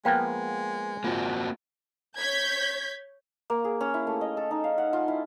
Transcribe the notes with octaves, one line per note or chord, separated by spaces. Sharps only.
F3 G#3 A#3 B3 F5 G5 A5
A#3 C4 F4 F#4
C#5 G6 G#6 B6
A#3
G#4
C#4
E4
A3
D#5
A4
D#4
F5
F#5
F4
E4